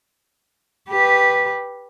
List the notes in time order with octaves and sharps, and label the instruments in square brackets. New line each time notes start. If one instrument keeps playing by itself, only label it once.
[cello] G4 B4